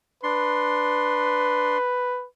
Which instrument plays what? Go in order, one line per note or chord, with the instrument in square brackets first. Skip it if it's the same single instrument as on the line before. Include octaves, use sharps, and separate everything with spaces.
[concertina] D4 C6 [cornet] B4